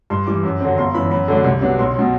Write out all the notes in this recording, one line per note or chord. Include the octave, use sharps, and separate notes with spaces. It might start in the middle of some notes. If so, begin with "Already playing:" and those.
G2 C6
E3 G3 D6
F#2
D3 F#3 C4
G1 C6
F#2 E3 B5
F#2 B5
D3 F#3 A3 D4
C2
C3 F#3 B3 D4
B1 C6
B2 F#3